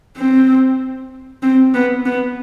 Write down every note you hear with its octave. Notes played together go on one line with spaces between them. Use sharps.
C4
C4
B3
B3